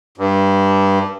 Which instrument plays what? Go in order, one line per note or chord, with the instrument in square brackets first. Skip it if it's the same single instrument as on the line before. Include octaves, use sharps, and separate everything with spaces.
[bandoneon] G2